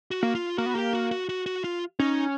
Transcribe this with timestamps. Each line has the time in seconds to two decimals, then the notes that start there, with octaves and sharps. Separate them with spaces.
0.11 F#4
0.23 A#3
0.35 F4
0.58 A#3 F#4
0.66 B3
0.74 A#3 G4
0.93 F#4
1.11 F#4
1.29 F#4
1.46 F#4
1.64 F4
1.99 C#4 D#4